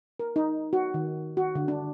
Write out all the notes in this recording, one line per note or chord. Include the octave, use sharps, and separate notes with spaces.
A#4
D#4
F#4
D#3
F#4
D3
D4